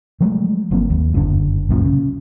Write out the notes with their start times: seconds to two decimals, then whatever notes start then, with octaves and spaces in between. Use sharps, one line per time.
0.21 F3 F#3 G#3 A3
0.71 G1 F#3 A#3 C4
0.90 D#2
1.13 F#1 G2 B2 D3
1.69 C2 F#2 A#2
1.85 C#3